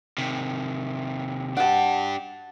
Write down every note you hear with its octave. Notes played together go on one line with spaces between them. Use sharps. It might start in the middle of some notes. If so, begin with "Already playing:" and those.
C3 D#3
D4 G4 F#5 A5